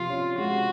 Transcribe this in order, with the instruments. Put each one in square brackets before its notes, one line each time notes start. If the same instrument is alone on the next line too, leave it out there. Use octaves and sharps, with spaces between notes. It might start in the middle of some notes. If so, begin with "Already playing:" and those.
Already playing: [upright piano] C3 F3 [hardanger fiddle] F4
[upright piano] C#4
[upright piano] G#3 [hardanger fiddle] F#4